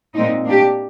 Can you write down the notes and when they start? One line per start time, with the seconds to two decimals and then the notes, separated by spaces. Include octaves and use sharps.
0.15 A#2 G#3 C4 D#4
0.46 A#3 D4 G4